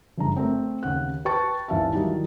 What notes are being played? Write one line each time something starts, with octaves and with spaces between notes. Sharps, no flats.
F#1 G2 A#5
A3 C4
D#2 C#3 F#5 F#6
B4 G5 A5 C#6 A6
G#1 D#2 E3 E5 F5 A5
D#3 F#3 G3 D#4 E4 G4